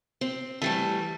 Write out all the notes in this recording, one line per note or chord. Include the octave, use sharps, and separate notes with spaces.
C4
E3 G3 A3 A4